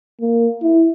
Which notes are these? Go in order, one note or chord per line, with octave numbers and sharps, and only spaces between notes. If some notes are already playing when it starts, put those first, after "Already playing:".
A#3
E4